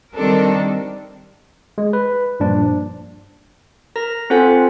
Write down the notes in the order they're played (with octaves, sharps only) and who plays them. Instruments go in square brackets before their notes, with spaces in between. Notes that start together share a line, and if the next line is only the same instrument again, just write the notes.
[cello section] D#3 G3 C4 D4 A4 A#4
[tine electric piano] G#3
B4
G2 A#2 F3 D4
[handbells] A#4 A#5 A#6
C4 F4 A4 C5 F#5 G#5